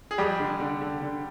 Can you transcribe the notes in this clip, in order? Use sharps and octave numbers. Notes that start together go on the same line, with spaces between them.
G#4
F2 G3 G4
D3
D3
D3
D3